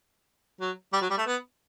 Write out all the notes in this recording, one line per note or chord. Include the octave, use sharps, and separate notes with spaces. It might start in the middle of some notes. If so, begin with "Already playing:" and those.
F#3
G3
F#3
G3
A3
B3